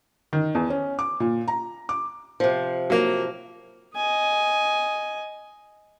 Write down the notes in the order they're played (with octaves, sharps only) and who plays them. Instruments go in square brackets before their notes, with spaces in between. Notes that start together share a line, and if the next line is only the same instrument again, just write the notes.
[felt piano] D#3
E2
C#4
D6
A#2
A#5
D6
[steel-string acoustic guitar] C3 F3
[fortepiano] F#3 A#3
[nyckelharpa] D#5 G#5